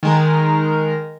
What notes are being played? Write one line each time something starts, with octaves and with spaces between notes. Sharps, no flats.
D#3 G#3 A#4